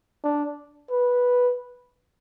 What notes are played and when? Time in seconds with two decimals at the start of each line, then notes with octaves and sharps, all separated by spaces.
0.23 D4
0.91 B4